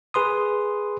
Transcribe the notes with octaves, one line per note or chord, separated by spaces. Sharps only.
G#4 B4 C6 D#6